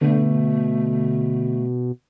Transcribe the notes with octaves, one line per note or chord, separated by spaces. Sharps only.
B2 D3 A3